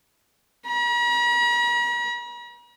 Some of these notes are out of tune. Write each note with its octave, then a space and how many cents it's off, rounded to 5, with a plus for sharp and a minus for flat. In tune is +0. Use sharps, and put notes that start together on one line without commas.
A#5 +45